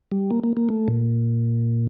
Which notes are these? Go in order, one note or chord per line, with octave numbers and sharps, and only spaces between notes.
G3
A#3
A#3
A#3
A3
A#2